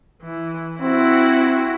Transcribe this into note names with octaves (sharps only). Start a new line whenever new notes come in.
E3
C4 E4 F#4